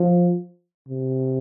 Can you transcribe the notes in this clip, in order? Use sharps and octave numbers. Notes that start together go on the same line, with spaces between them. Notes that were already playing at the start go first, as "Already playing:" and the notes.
Already playing: F3
C3